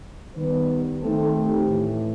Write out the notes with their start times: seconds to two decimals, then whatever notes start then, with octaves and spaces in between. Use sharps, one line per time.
0.36 D#3 G3 B3 B4
1.02 D#3 A3 C4 A4
1.35 G4
1.68 A2 E3 A3